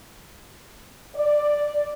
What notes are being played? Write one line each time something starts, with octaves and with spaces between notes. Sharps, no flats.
D5